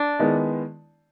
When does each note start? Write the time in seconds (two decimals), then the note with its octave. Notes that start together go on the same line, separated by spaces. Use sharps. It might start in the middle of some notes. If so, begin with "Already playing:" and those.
Already playing: D4
0.19 D#3 G#3 B3 E4